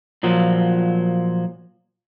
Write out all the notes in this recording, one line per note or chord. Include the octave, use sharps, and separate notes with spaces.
A#2 F3 F#3